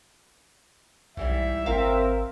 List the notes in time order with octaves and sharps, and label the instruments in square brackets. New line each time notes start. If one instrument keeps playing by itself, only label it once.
[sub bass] B1 [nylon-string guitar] G#2 E3 G3 [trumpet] E5
[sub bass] G#1 [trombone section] C4 A#4 [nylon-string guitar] F5